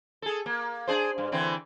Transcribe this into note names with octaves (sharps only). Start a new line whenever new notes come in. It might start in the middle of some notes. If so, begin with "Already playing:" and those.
G#4 A4
A#3
D4 G#4 C5
G2
D3 E3 C4